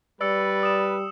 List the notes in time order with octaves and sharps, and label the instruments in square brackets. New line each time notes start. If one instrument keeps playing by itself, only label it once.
[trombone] G3 [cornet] B4 [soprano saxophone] D5 [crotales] E6 C#7
[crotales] D#6 E7